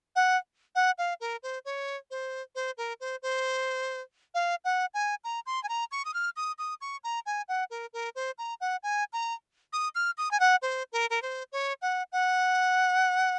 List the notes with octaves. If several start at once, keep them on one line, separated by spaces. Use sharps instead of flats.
F#5
F#5
F5
A#4
C5
C#5
C5
C5
A#4
C5
C5
F5
F#5
G#5
A#5
C6
G#5
A#5
C#6
D#6
F6
D#6
D#6
C#6
A#5
G#5
F#5
A#4
A#4
C5
A#5
F#5
G#5
A#5
D#6
F6
D#6
G#5
F#5
C5
A#4
A#4
C5
C#5
F#5
F#5